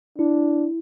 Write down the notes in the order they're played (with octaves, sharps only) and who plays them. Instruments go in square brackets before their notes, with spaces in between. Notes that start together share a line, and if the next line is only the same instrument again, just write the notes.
[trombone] D4 [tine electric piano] E4